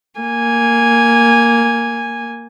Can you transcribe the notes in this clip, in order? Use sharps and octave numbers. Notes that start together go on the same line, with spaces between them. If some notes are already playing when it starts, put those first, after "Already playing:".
A#3 G#5